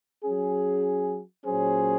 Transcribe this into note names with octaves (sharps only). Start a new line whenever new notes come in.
F#3 C#4 G#4
A#2 F#3 C#4 G#4 C5